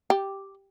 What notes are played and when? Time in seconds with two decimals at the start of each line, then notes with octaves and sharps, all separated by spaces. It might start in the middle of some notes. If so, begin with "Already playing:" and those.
0.10 G4